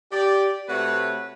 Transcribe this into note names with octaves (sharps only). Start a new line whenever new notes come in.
G4 D5
C3 A3 F#4 B4 C#5